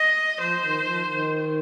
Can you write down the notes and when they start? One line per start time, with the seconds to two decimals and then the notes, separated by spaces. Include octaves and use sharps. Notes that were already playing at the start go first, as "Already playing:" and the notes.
Already playing: D#5
0.39 F3 C5
0.63 D#3
0.86 F3
1.10 D#3